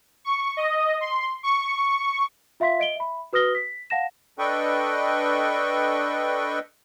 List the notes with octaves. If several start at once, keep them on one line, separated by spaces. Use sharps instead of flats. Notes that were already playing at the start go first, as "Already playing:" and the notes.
C#6
D#5
C6
C#6
F4 E5 F5 C6 B6
D#5 D7 G7
E5 B5
F#4 B4 D#6 F6 A#6 G7
B6
F5 F#5 A5 A#6 E7
D4 A4 B4 D#5 G5 C#6